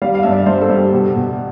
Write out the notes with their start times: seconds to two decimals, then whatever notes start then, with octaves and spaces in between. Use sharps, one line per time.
0.02 G3 F5
0.15 F5
0.23 G2 E5
0.32 D5
0.46 G2 C5
0.61 A4
0.69 G2
0.77 G4
0.93 B2 G4
1.15 B2